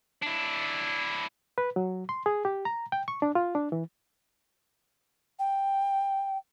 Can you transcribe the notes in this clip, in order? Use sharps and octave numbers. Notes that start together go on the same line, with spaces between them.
D4 E4
B4
F#3
C6
G#4
G4
A#5
G5
C#6
D4
F4
D4
E3
G5